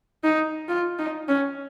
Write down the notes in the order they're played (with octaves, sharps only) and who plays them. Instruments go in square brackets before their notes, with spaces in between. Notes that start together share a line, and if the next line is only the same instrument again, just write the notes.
[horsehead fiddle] D#4
F4
D#4
C#4